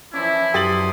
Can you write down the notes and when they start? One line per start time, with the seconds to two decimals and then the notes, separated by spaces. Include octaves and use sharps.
0.14 E3 F3 C#4 D4 E4
0.54 F#2 G4 C6 D#6 A6 F#7